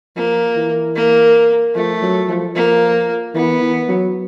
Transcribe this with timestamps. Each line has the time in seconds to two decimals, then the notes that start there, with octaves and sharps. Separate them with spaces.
0.16 F3 A#3
0.56 E3
0.96 A#3
1.75 F3 A3
2.02 F#3
2.29 F3
2.55 F3 A#3
3.34 E3 B3
3.61 E3
3.88 F#3